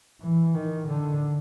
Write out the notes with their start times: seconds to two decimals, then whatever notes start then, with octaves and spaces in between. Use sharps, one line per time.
0.22 E3
0.54 D#3
0.87 D3